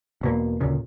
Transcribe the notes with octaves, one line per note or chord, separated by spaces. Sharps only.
E1 B2 A#3
D2 A#2 C#3